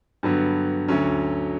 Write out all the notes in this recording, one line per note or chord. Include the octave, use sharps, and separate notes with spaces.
G2 D3 F#3 B3
D2 D3 F#3 C#4